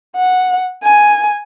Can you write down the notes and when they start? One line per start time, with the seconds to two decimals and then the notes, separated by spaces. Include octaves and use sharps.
0.16 F#5
0.84 G#5